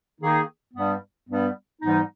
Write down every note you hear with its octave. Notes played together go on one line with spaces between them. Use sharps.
D#3 A#3 D#4 G#4
G2 G3 B3
G2 G3 B3
G#2 E3 G3 B3 D#4